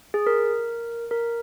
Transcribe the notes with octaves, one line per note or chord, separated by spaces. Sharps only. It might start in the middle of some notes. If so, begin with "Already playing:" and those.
G#4
A#4
A#4